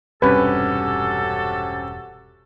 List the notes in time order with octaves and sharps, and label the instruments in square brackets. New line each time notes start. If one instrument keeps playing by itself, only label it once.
[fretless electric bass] E1 G2 [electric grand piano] C3 C#4 [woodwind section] F#4 G4 A4 [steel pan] B4